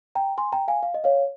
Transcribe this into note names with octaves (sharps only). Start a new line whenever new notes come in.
G5 A#5
G#5 C6
G5 A#5
F5 G#5
F5
D#5
C#5 F5